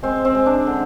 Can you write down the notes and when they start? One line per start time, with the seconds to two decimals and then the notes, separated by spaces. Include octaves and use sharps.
0.03 G#3 C4
0.25 C4
0.35 G#3
0.46 D4
0.67 D3